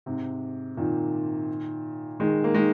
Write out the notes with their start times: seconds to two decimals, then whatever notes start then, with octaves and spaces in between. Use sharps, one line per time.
0.06 G#2 C3
0.77 A#2 D#3
2.20 D#3 G#3
2.44 A#3
2.54 D#3 G#3